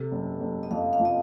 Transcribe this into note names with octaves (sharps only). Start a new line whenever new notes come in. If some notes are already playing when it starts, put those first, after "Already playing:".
Already playing: C3 A4
F#1
F#1
D#5
F2 F5
F5
F3
D#5